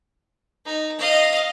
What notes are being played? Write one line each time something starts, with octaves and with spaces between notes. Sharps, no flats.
D#4
D#5 F5